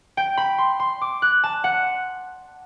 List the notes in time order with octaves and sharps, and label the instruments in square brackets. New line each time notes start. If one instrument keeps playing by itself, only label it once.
[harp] G5
B5
C6
C6
D6
F#6
A5
F#5